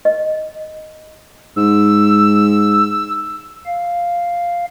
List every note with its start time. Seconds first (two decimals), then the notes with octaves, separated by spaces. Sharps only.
0.05 D#5
1.57 G#2 E6
3.66 F5